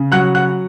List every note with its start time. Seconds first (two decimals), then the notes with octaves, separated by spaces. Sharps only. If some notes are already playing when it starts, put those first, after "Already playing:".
Already playing: C#3
0.12 F#3 F#5 F#6
0.35 F#5 F#6